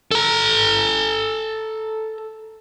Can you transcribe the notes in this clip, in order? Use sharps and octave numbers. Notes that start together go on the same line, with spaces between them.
A4 A#5